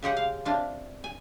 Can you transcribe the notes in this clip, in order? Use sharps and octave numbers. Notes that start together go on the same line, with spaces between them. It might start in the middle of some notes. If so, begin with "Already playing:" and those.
C#3 G#3 G4 F#5
F5
C3 D4 F4
G#5